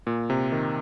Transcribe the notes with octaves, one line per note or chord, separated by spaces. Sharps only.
A#2
C3
D#3